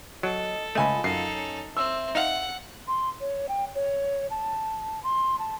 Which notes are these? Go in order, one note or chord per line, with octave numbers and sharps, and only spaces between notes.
F#3 A4 D#5
C#2 A3 F4 D#5 G#5 B5
F#2 D#4 A4 C7
C#4
C4 E5 E6
D#4 F5 F#5
C6
C#5
G5
C#5
A5
C6
A5